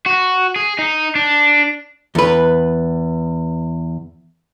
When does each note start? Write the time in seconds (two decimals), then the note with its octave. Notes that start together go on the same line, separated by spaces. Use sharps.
0.06 F#4
0.56 G#4
0.79 D#4
1.15 D4
2.15 E2 B4